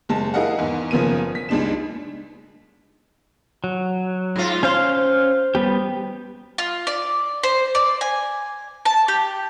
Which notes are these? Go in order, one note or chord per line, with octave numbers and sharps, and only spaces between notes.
F#1 G#3 A5
E4 G#4 A#4 D#5 F5 F#5
E2 G#2
F#1 C#3 F3 A#3 B3 D#7
B6
C#2 G#3 D4 D#4 E7
F#3
G#2 F4
C#4 C5 F5 C6
G3 B3 G4
F4
D5
C5
D5
G#5
A5
G4